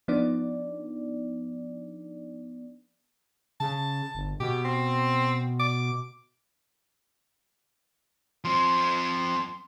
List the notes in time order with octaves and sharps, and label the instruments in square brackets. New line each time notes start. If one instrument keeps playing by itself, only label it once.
[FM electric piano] F3 B3 D4 D#4 D5
[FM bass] C#3 [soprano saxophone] A5
[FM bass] G1
[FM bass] B2 [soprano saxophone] G4
[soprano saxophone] C4
D6
[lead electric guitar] F3 C4 [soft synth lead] C6